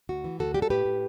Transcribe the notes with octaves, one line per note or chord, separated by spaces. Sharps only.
D2 F#4
E3
D2 F#4 A4
G3 G4
A4
A2 G4 B4
A2